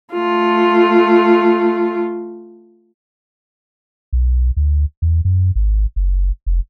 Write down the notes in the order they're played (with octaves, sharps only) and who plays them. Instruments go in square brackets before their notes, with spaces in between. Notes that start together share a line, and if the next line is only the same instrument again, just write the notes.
[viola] A3 F4
[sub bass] B1
D2
E2
F#2
G#1
F#1
F1